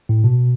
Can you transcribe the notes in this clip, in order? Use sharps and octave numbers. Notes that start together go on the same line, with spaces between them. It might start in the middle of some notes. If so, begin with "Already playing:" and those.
A2
B2